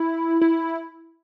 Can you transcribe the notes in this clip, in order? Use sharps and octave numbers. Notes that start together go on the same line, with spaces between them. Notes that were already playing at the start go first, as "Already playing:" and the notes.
Already playing: E4
E4